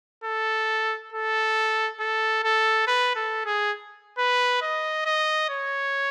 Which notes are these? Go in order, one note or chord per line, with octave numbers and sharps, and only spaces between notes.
A4
A4
A4
A4
B4
A4
G#4
B4
D#5
D#5
C#5